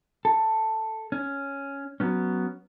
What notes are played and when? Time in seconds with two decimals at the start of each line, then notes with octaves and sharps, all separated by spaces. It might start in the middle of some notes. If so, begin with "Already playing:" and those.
0.25 A4
1.12 C#4
2.00 F#3 B3 C#4